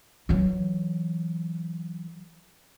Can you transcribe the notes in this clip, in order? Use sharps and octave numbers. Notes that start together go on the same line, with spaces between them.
E3 F#3